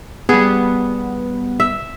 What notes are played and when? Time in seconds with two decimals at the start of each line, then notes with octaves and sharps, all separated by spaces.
0.29 G3 B3 G#4
1.60 E5